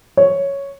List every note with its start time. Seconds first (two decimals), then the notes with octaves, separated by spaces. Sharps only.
0.17 C#5